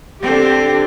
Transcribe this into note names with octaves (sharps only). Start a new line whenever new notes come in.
D3 C4 D4 G4